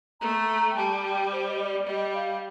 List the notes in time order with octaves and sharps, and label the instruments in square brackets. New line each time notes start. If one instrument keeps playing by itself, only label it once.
[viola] A3 [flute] A#5
[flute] G5
[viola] G3 [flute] A5
[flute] G5
C5
D#5
D5
[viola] G3 [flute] D#5
[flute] F5